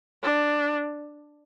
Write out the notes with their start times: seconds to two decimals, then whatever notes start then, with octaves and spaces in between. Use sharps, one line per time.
0.23 D4